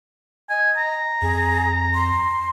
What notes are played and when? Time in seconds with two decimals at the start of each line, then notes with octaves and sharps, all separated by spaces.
0.50 D#5 G#5
0.77 A#5
1.22 F2 G#4
1.94 C6